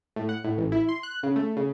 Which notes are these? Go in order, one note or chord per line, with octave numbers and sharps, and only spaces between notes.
A2
F#5
A2
A1
E4
C6
F#6
C#3
A3
C#3